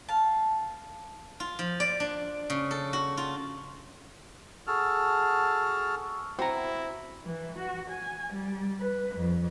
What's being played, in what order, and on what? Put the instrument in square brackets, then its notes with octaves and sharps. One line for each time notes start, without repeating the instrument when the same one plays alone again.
[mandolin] F5 A5
[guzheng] F4
F3
D5
D4
C#3
A4
F#4
F4
[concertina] F#4 G#4 A4 A5 F6
[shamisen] C4 [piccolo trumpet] E4 [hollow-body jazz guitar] F#4 A#5
[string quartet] E3
F#4
G#5
G3
B4
F2